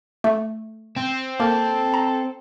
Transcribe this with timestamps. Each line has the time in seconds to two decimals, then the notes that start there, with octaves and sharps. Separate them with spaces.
0.24 A3
0.96 C4
1.40 A#3 A4
1.94 A#5